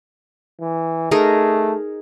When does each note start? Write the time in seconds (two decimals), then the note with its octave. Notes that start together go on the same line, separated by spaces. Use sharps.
0.61 E3
1.11 A3 D#4 G#4 A#4